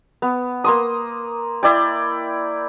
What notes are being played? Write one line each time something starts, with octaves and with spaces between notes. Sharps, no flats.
B3
A#3 C6 D#6
E4 D5 G5